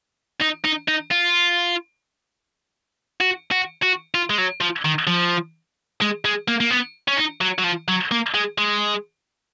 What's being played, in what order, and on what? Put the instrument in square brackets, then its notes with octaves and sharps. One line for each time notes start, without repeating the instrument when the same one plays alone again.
[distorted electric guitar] D#4
D#4
D#4
F4
F#4
F#4
F#4
F4
G#3
F#3
F3
D#3
F3
G#3
G#3
A#3
A#3
B3
C#4
D#4
F#3
F#3
F3
F#3
A#3
G#3
G#3